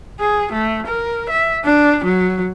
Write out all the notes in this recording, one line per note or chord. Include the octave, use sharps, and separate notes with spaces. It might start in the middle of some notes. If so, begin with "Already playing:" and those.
G#4
A3
A#4
E5
D4
F#3